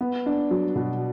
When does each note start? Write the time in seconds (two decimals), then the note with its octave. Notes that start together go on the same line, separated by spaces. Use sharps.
0.01 B3
0.26 D4
0.51 F#3
0.76 B2